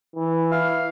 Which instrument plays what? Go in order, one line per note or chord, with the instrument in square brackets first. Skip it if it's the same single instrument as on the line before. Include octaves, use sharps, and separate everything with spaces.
[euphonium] E3
[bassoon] E4 [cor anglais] F5